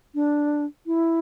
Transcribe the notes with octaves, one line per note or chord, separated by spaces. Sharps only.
D4
E4